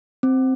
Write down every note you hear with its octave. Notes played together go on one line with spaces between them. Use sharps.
C4